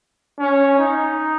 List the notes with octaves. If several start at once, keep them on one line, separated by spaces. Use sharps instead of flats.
C#4
D#4